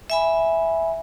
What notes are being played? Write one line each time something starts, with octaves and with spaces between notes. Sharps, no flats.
E5 G#5 B5